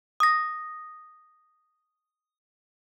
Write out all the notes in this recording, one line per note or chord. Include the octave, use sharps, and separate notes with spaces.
D#6 A#6